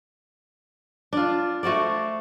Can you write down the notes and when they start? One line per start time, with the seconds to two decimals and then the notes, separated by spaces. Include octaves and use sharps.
1.13 D4 F4
1.63 A3 F#4 C5 D5